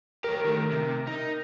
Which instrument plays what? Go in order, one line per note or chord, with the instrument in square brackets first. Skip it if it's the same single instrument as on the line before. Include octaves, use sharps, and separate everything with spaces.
[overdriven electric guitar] G4 C#5 [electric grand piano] A#4
[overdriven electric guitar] D#3 A3
C3
D#4